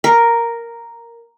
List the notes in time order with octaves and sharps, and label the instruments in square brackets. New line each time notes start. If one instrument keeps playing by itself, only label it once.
[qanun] A#4